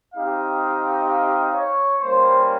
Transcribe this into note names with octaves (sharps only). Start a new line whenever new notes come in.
C4 D#4 G4 F5
F5
C#5
G3 A#3 C#4 C5